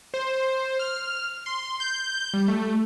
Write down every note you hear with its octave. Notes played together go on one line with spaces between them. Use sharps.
C5
F6
C6
G6
G3
A3